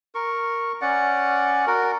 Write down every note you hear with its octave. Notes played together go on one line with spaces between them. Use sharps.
A#4 C#6
C#4 D5 F#5
F#4 A#4